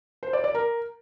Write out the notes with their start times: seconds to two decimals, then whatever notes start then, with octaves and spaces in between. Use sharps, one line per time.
0.23 C5
0.33 D5
0.44 D5
0.55 A#4